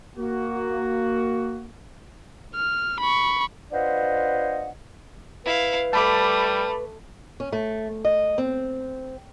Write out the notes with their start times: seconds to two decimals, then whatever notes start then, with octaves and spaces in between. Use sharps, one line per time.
0.18 A#3 F#4
2.55 F6
3.00 B5 C#6
3.72 D4 F4 B4 C5 D#5 F#5
5.45 E4 B4 F5
5.93 G3 A3 A5 B5 D6
7.40 C#4
7.53 A3
8.05 D#5
8.38 C4